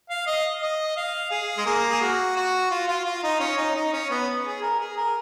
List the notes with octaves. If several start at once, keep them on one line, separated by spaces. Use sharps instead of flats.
F5
D#5
D#5
F5
G#4
G#3
A#3
G#4
F#4
F#4
F4
F4
F4
D#4
C#4
D#4
D#4
C#4
B3
G#4
A#4
G#4
A#4